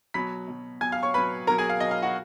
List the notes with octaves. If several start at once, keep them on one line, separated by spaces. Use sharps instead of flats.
B2 F#3 B5 B6
B2 F#3
B2 F#3 G#5 G#6
F5 F6
C#5 C#6
B2 F#3 B4 B5
B2 F#3 A#4 A#5
G#4 G#5
F5
B2 F#3 D#5
F5
F#4 F#5